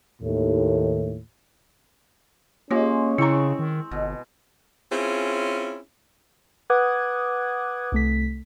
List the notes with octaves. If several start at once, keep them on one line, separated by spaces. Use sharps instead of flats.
D#2 A2
G#3 A#3 C#4 F4 G4 C#5
C#3 C4 E4 A#5 C#6
D#3
G1 B2
C4 C#4 E4 F4 G#4
B4 F#5 D6 D#6 F#6 G#6
C2 A3 B6